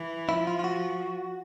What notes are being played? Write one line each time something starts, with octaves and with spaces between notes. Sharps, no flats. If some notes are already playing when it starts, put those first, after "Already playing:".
Already playing: E3
F3 E4
F4
F4
F#4